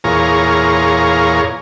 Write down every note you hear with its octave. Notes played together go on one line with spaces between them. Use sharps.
E2 A#2 F4 G#4 C#5 A#5